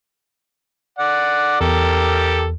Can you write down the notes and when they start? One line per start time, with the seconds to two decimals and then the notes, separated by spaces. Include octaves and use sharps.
0.99 D5 F#5
1.61 E2 G4 A4 A#4